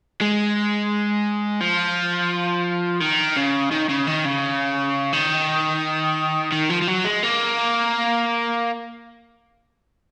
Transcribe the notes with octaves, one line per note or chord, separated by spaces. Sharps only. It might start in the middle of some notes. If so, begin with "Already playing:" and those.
G#3
F3
D#3
C#3
D#3
C#3
D#3
C#3
D#3
D#3
F3
F3
F#3
G#3
A#3